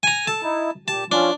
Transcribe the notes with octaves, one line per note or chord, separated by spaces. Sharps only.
G#5 A#5
A4 A5
D#4 E4
A#2 G4 A5
F3 C#4 D4 F4